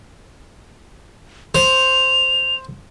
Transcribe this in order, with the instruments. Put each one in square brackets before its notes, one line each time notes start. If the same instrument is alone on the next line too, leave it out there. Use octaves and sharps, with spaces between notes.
[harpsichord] C5 [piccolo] F7